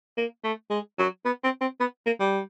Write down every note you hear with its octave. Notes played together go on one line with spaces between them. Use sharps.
A#3
A3
G#3
F#3
B3
C4
C4
B3
A#3
G3